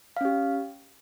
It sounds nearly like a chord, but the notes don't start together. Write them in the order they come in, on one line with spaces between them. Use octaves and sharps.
F5 C#4 G4